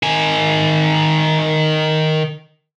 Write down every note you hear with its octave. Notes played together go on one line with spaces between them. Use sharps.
D#3 G#5